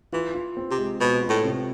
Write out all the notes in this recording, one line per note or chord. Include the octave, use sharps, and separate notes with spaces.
E3 F4
F4
C4
C3
G#3
B2 G#3
F4
A2
C3